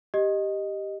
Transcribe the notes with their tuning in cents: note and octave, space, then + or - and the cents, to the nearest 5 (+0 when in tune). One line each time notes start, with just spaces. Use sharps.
G4 +0 D#5 -5